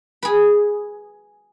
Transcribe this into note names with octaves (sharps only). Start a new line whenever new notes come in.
G#4 B4